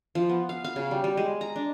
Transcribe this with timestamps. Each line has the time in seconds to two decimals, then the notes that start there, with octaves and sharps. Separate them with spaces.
0.15 F3
0.29 B3
0.49 F5
0.64 F5
0.76 C#3
0.91 G3
1.04 G3
1.17 G#3
1.41 A#5
1.56 D4